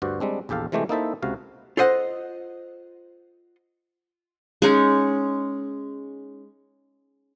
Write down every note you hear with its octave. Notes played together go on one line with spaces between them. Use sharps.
D2 G2 F#4 C5 D5
G3 G#3 C4 D4
A#1 E2 G4 A4 F5
C3 E3 G#3 A3 G4 C5
A#3 D#4 E4 A4 C5 E5
C#2 C3 F#4 F5
F4 A4 C5 D#5 F#5
G#3 C#4 D#4